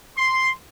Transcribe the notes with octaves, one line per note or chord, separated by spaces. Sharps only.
C6